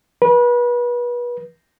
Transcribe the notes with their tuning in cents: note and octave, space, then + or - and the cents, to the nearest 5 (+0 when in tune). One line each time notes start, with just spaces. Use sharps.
B4 -30